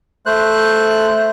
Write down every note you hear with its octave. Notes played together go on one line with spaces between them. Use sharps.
A3 C5 F#6